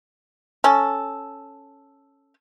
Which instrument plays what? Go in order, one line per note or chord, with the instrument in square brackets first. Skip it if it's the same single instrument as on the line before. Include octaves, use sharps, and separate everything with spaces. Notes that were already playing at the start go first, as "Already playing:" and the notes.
[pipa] C#4 A4